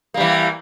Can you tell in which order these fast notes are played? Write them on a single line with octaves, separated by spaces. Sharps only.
A#3 G3 E3